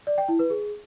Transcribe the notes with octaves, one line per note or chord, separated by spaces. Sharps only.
D5
G5
E4
B4
G#4